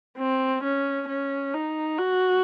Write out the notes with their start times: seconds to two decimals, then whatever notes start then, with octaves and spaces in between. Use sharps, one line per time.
0.18 C4
0.64 C#4
1.09 C#4
1.54 D#4
1.99 F#4